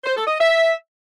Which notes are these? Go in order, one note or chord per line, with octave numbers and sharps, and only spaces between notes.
C5
A4
D#5
E5